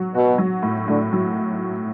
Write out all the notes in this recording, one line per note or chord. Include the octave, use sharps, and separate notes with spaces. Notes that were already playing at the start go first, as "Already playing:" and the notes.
Already playing: F#3 F#4
B2 F#4
F#3
A2
A2 D3
F#3